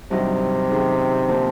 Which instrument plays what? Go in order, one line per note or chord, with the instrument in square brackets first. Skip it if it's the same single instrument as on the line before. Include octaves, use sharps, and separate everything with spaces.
[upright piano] G2 D#3 F#3 [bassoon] C3
[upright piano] F#2 D#3 G#3
D3 F3 A#3